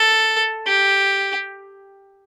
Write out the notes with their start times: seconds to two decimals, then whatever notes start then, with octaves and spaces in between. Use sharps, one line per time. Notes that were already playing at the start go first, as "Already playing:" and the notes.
Already playing: A4
0.67 G4